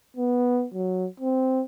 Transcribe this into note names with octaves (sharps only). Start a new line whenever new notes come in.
B3
F#3
C4